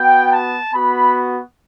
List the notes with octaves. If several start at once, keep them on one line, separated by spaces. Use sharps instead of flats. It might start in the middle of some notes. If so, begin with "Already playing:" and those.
Already playing: B3 F#4 G5
A5
B3 F#4 B5